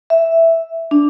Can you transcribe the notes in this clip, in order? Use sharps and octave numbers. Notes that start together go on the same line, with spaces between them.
E5
D4